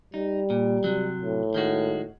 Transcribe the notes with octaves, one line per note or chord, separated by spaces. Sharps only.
G3 D#4
A#2
C3 F#3
A2
D#3 G#3 F#4